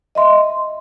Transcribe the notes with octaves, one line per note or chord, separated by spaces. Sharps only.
D#5 E5 C6